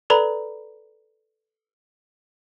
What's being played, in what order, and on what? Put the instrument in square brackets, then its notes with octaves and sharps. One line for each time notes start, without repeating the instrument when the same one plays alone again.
[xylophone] A4 B4 D5 A#5 B5